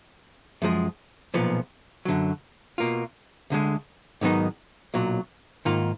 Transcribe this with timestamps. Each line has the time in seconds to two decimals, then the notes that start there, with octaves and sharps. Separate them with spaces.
0.62 F#2 F3 G#3
1.34 B1 A#2 F3 B3
2.05 F#2 D3 F#3
2.78 B2 A#3 F4
3.50 D2 D3 G#3
4.21 G#2 D#3 F#3 B3 D#4
4.94 B1 A#2 F#3
5.65 G#2 D#3 A#3 F4